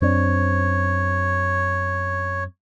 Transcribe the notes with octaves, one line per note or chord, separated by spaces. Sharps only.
F#2 C4 D4 C#5